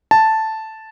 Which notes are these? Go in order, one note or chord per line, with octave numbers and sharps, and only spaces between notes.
A5